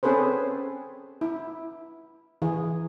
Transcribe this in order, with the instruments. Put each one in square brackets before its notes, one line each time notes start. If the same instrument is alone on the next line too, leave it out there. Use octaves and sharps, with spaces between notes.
[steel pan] C4 C#4 G#4 A4 B4 C5
E4
E3 G#4